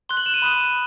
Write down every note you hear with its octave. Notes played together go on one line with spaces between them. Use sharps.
C6 F#6 G7
F#7
E7
D#7
B5 D#6 F#6